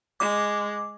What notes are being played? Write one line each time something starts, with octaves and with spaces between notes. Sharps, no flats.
G#3 D6